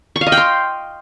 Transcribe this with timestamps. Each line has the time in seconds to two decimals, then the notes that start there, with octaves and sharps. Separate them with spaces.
0.16 C#6
0.21 F5
0.27 D#5
0.32 G5
0.37 C6